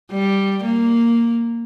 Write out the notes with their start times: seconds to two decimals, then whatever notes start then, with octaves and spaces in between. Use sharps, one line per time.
0.12 G3
0.63 A#3